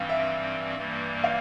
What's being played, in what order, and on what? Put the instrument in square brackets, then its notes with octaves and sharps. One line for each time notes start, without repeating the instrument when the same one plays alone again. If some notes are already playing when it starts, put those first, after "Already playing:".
Already playing: [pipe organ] G2 E3 G3 C4 [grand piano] F5
[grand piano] E5
[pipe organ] G2 E3 G3 A#3
[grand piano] F5